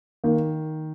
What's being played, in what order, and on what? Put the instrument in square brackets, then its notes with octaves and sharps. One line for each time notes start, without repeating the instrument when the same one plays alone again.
[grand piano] D#3 [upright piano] A#3